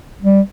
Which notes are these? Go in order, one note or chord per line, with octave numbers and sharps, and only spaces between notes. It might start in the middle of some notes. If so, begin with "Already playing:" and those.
G3